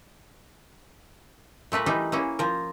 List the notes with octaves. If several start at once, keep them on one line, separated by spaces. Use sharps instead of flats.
A#2 A3 A#4 B4
E3 G3 D#4
E3 A#3 C#4
F3 A#4